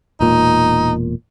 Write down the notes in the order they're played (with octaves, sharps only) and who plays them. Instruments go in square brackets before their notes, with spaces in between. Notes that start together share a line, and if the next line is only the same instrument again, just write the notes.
[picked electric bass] E1 A#2 [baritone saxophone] D#4